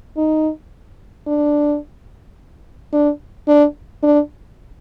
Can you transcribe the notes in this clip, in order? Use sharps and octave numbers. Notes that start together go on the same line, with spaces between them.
D#4
D4
D4
D4
D4